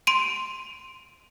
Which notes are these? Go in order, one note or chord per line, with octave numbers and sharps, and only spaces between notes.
C6 D7 D#7